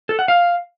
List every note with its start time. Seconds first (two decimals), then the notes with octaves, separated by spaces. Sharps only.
0.09 A4
0.19 F#5
0.28 F5